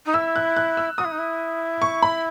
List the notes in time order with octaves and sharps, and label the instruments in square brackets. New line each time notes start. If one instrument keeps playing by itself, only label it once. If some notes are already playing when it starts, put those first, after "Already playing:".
[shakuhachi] D#4
[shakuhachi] E4 [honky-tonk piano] E6
[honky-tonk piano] F#6
F#6
E6
[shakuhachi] F#4 [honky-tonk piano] D#6
[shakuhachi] E4
D#4
E4
[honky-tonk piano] C#6
B5